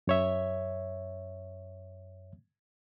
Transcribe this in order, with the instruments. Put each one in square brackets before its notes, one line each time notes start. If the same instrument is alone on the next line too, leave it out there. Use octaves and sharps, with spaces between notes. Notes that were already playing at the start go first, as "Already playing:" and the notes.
[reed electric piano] F#2 C#5 E5